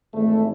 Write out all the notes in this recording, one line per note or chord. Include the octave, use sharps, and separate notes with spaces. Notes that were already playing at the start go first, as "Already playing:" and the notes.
G#1 G#2 E3 A3